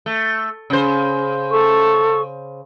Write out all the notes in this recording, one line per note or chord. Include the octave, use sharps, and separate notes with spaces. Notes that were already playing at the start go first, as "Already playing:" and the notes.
A3
C#3 C5
A4 C#6